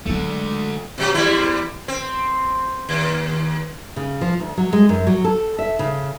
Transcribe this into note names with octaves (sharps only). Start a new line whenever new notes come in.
D3 F#3 G#3 A3
B2 F#3 G4
E2 G3 E4
C4
D#2
C#3
F3
D2
F#3
G#3
F#2
F#3
A4
E5
C#3